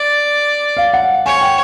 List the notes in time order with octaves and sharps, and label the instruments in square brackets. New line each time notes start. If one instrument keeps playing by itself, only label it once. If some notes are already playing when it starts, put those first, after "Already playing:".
Already playing: [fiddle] D5
[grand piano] F5
F#5
[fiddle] C#5 [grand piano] G#5
[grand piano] G5